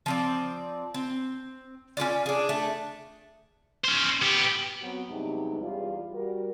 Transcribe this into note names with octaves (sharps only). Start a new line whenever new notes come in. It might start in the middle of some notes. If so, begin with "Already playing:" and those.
F3 C4 D5
C4
C#4 E4 F4 D5
D4 G#4
A3 D4
C#4 C5
B3 G4
F#3 B3 C4 F#4
G2 C3 F#3 G#3 B3 D#4
E2 G3 F4
G3 F#4 A#4